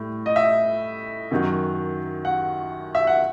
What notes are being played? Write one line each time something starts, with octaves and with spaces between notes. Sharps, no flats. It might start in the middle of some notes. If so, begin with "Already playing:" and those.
Already playing: A2 G3
D#5
E5
F#2 D#3 F#3
F#5
E5
F#5